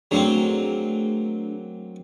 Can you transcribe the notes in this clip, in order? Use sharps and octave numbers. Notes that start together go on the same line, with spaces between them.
F#3 A3 A#3 C4 D4 G#4